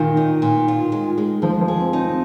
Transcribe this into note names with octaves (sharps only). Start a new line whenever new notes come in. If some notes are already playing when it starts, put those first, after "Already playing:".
Already playing: A#2 D#3
D#4
A#2
F4
G#3
G#3
F3 G#3
F3
G#4
C4
D#4
C4